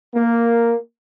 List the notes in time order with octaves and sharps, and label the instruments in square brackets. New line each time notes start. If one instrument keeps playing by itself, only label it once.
[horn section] A#3